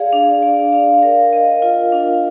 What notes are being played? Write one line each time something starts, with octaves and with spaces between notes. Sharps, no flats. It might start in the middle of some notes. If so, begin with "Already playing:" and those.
Already playing: G#4 D5 F5
D4
D5
F5
A#4
D#5
F4
D4